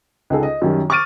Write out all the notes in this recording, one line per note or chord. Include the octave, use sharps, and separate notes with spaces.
C#2 D#4 G#4 A4
D#5
F#2 D#3 G3
C#6 D6 F6 A6 D7 D#7